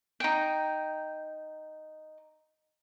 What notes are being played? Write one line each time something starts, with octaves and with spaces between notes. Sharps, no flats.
D#4 G5